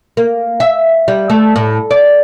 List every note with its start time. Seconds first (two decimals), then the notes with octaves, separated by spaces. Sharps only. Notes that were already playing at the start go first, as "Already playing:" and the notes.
0.17 A#3
0.60 E5
1.08 G3
1.30 A3
1.56 A2
1.91 D5